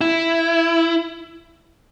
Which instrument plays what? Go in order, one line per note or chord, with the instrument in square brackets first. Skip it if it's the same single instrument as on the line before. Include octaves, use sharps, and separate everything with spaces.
[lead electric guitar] E4